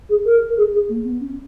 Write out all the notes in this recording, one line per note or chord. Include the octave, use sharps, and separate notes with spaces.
G#4
A#4
A#4
G#4
G#4
A#3
B3
C#4